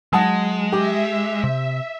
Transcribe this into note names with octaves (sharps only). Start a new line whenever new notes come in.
F#3 G#3 F#5 A5 D#6
G4 E5 D6
C3